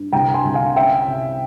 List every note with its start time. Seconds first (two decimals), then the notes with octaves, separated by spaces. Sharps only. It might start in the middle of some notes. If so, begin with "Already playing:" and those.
Already playing: G2
0.12 C2 G5 A#5
0.34 G#5 C6
0.45 C2
0.54 F5 G#5
0.75 C#4 E5 G5
1.08 C3